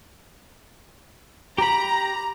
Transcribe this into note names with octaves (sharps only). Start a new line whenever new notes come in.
G4 A#5 B5